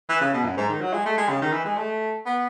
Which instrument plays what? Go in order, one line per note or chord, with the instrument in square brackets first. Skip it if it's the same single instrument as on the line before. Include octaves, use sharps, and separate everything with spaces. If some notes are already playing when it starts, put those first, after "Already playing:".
[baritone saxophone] E3
C#3
B2
F#2
G#2
D#3
F#3
G#3
A3
G#3
C#3
D#3
E3
G#3
A3
B3